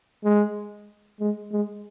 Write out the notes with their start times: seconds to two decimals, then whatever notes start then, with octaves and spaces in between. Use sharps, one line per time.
0.24 G#3
1.20 G#3
1.52 G#3